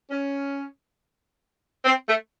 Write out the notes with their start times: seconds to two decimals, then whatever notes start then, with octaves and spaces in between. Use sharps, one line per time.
0.10 C#4
1.85 C4
2.08 A3